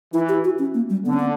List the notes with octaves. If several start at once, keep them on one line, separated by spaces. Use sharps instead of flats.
E3 E4
G4
F#4
C#4
A#3
G3
D3 B3
C#4
B3